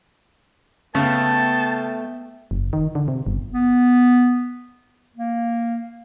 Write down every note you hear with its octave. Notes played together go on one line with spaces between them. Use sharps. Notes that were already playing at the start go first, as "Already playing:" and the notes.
C#3 A3 B3 G5 A5
F#1
D#3
D3
C3
G1
B3
A#3